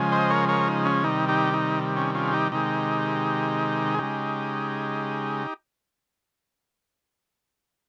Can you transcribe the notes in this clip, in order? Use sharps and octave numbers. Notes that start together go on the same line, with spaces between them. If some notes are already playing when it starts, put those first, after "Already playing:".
Already playing: C#3 F3 G#3
C5 D#5
A#4 C#5
A#4 C#5
D#4
C#4
C3 D#3 G3 D#4
D#4 G4
D#4
C#4
C#4 F4
G#4
D#4 G4
C3 D#3 G#3 D#4 G4
G#4
C#3 G#3 D#4 G4